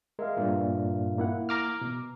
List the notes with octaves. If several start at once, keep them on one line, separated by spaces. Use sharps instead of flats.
G#3 A#4 E5 F5
G2 A#2
A#3 E4 F#5
A#5 D6 F6
B2